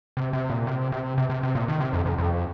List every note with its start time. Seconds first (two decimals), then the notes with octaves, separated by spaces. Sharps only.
0.17 C3
0.33 C3
0.50 A#2
0.67 C3
0.92 C3
1.18 C3
1.30 C3
1.43 C3
1.55 A#2
1.68 D#3
1.80 C3
1.93 F2
2.06 F2
2.18 F2